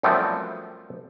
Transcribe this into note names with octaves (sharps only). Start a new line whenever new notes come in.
F#2 F3 G3 A3 B3 C4